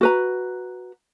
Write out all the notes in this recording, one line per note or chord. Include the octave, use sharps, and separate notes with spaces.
F#4 B4 A#5